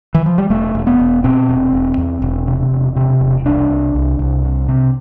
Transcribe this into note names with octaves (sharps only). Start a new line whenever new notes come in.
E3
F3
G3
E1 A3
E1
B3
E1
B2 C4
E1
E1
E2
E1
C3
E1
C3
E1
C2 D4
C2
C2
C2
C3
C3